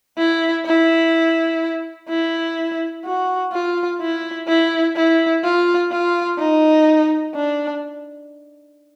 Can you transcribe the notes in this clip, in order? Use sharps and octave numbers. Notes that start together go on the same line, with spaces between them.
E4
E4
E4
F#4
F4
E4
E4
E4
F4
F4
D#4
D4